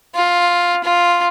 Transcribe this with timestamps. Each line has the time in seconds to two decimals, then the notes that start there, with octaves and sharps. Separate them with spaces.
0.15 F4
0.83 F4